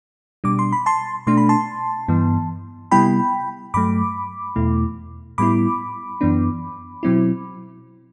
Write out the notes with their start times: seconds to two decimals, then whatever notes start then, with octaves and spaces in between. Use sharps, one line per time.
0.44 B2 G3 D4 D6
0.59 C6
0.72 B5
0.86 A5 C6
1.27 B2 A3 D4 C6
1.37 B5
1.49 A5 C6
2.08 G2 E3 B3
2.91 C3 G3 B3 E4 G5 B5
3.74 G2 F#3 A3 B5 D6
4.56 E2 B2 A3 E4
5.38 A2 G3 B3 E4 B5 D6
6.21 F#2 E3 B3 D4
7.03 B2 F#3 C4 E4